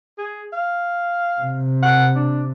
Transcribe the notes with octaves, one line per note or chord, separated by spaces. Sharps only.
G#4
F5
C3
F#5
D4